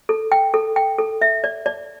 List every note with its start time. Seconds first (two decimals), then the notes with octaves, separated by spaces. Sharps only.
0.09 A4
0.32 G5
0.54 A4
0.76 G5
0.99 A4
1.21 E5
1.44 D5
1.66 D5